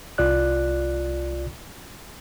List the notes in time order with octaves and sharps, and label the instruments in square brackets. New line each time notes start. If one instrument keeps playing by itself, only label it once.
[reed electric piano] C2 F4 D5 F#6